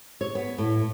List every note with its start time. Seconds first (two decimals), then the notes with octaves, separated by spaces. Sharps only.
0.21 C#5
0.35 B3
0.58 A2